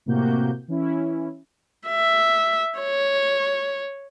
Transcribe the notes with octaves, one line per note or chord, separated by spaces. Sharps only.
A2 C3 A#3 F#4 G4 G6
E3 C#4 E4
E5
C#5